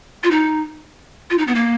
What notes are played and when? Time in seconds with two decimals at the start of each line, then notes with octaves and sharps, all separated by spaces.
0.24 F4
0.31 D#4
1.30 F4
1.38 D#4
1.48 B3
1.55 A#3